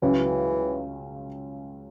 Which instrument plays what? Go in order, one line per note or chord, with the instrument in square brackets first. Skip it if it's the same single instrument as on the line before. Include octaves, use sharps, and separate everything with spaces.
[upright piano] C#2 C#3 F#3 C#4 [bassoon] E3